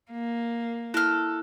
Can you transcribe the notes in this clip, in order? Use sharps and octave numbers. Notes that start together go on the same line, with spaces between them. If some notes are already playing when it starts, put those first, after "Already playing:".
A#3
E4 A4 F6 F#6